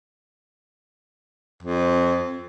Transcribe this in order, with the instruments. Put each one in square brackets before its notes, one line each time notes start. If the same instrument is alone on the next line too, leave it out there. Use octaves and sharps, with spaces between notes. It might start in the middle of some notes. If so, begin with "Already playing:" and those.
[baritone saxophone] F2